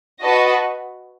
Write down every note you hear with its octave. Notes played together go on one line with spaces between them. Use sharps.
F#4 B4 D#5 A5